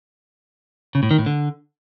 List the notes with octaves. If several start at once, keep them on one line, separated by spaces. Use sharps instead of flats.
C#3
A2
D#3
A2
D3